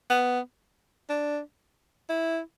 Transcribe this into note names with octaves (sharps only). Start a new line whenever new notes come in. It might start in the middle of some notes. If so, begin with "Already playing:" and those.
B3
D4
E4